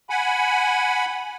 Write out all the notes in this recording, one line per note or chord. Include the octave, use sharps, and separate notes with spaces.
F#5 G#5 B5